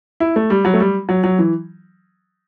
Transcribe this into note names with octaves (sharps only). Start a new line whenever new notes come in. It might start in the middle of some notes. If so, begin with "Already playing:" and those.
E4
A3
G3
F#3
A3
G3
F#3
F#3
E3